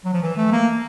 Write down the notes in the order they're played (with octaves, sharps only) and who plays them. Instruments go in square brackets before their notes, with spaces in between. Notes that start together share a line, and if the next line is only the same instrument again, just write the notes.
[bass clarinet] F#3
F3
E3
A3
A#3